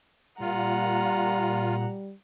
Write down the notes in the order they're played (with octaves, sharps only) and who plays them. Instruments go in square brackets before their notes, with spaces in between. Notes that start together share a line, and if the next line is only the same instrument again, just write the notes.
[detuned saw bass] A#2 [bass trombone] G3 [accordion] F4 [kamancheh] F#5 A#5